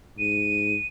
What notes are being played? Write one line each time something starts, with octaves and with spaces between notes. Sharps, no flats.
G#2 D#7